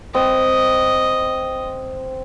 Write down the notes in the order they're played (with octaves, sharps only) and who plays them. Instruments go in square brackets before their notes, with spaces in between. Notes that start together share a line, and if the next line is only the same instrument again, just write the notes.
[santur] C4 [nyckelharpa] D#5